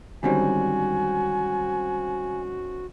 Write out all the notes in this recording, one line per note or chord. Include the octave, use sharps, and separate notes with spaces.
G#2 D3 D#3 G3 C4 C#4 F#4 G#5